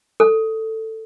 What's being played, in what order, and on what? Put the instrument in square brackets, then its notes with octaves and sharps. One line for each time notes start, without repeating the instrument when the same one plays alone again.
[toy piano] A4